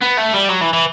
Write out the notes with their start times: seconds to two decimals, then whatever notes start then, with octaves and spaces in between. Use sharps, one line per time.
0.02 B3
0.18 A3
0.34 G3
0.49 F#3
0.61 E3
0.73 E3